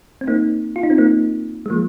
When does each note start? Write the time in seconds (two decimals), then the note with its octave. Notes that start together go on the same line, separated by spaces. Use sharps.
0.21 C4
0.27 A#3 D#4
0.76 F4
0.83 D#4
0.90 C4
0.98 A#3 D#4
1.66 G#3
1.70 F3 A#3